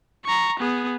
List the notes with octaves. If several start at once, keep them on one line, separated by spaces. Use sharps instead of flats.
A#5 C#6
B3 G#4